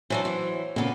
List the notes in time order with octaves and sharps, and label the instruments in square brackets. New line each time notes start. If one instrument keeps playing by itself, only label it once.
[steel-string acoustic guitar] E3 A3 D4 [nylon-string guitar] F#3 [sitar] C5
[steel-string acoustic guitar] E3
[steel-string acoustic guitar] A#2 B3 [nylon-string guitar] C#3 A#3 [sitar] A4